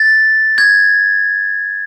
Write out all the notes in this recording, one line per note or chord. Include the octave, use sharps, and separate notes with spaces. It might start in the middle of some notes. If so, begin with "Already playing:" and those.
Already playing: A6
G#6